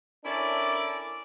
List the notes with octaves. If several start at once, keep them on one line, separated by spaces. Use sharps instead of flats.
C#4 D4 E4 A4 A#4 D5